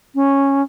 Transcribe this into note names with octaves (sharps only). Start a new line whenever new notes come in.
C#4